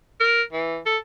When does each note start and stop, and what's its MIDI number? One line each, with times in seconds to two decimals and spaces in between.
0.20 0.43 70
0.53 0.78 52
0.86 0.97 69